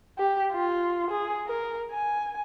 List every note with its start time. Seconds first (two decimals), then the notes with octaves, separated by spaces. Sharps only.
0.18 G4
0.52 F4
1.11 G#4
1.47 A#4
1.91 G#5